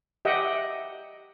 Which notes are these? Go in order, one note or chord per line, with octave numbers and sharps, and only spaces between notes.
G4 D#5 E5 F#5 G5